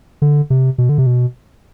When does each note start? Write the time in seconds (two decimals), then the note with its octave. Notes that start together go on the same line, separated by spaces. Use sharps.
0.22 D3
0.50 C3
0.78 B2
0.89 D3
0.98 C3
1.06 B2